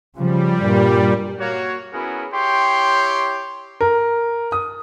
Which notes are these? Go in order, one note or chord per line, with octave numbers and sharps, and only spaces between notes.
C#3 F3 G3
G2 A#2
A#3 F#4 C#5
B3 C#4 E4 F#4 G#4 A#4
E4 G4 C#5 G5 C6
A#4
D#6